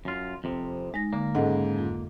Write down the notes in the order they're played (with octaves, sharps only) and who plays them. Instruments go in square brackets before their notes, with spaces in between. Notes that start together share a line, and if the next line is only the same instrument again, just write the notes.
[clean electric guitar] F#2 F4
F2 C3
[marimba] G#3 D#4 A#6
[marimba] D3 [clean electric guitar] A#3
[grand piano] G#2 C#3 [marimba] A4 D#5 F#5
[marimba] F2 F4